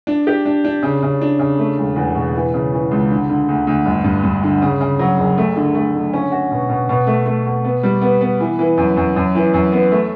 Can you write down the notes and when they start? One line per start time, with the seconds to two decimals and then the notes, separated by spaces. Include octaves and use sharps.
0.07 D4
0.27 G4
0.45 D4
0.64 D4
0.83 C#3
1.03 C#3
1.21 D4
1.39 C#3
1.59 A3
1.78 E1
1.96 E2
2.15 B2
2.35 E3
2.54 C#3
2.73 E3
2.91 C#2
3.10 D3
3.30 D3
3.48 D2
3.67 D2
3.86 G1
4.04 G2
4.23 G2
4.43 D3
4.62 C#3
4.81 C#3
4.99 F#3
5.18 F#1
5.38 A3
5.56 D3
5.75 A3
5.95 D3
6.13 C#4
6.32 F#4
6.51 B2
6.69 B2
6.89 B2
7.07 A3
7.26 A3
7.46 B2
7.64 B3
7.83 G3
8.01 B3
8.21 B3
8.40 E3
8.59 E3
8.77 F#2
8.97 F#2
9.16 F#2
9.35 E3
9.54 F#2
9.72 B3
9.92 A3